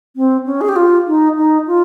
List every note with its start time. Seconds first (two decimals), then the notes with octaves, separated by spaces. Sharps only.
0.16 C4
0.46 C#4
0.61 G#4
0.69 G4
0.76 F4
1.07 D#4
1.37 D#4
1.67 F4